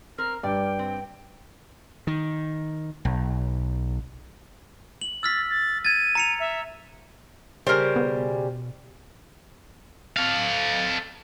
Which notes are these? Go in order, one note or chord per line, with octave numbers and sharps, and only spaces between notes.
C4 A#4 F6
G2 D5 G5
C4
D#3
B1
F#7
E6 F6 A6 B6
A6
G#6 A6 D#7
A#5 C#7 F7
E5
C#3 G3 A#4 C5
B2
A4 F5